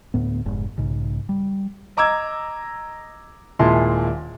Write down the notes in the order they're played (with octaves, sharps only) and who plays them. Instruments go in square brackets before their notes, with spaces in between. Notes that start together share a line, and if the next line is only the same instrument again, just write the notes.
[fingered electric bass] D2 A2 B3
F1 G#2
B1 G#2 C#3
G3
[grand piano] D#5 A#5 D6 E6 G#6
D#1 A#2 G#3 E4 A5 C6